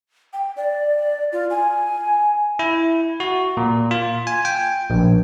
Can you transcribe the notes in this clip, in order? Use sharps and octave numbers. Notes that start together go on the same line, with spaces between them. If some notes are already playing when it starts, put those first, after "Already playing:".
G5
D5
F4
G#5
E4
F#4
A#2
F4
G#5
G5
A#1